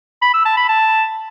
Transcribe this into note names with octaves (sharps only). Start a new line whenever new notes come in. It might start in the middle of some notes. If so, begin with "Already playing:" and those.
B5
E6
A5
B5
A5